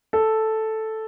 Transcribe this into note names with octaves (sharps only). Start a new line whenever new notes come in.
A4